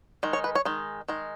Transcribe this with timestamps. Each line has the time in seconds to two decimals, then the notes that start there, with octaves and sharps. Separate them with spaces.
0.23 D#3 G#3
0.33 C#5
0.44 B4
0.55 C#5
0.65 D#3 G#3
1.08 D#3 G#3